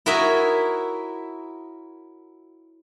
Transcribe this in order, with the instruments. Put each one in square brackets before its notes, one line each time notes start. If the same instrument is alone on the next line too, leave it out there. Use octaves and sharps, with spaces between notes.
[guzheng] E4 F#4 A#4 C#5 D#5 E5